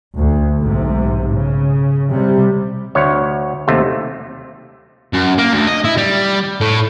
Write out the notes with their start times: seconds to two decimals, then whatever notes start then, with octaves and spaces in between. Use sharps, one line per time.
0.17 D2
0.59 B1 G#2 C3
1.33 C#3
2.10 C3 G3
2.95 D2 C#5
3.68 D#2 C3 A3
5.13 F#2
5.38 A#3
5.52 D2
5.67 D#5
5.85 E4
5.97 G3
6.61 A2